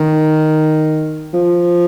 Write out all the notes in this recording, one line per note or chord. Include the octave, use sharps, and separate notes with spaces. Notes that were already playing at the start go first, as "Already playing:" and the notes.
Already playing: D#3
F3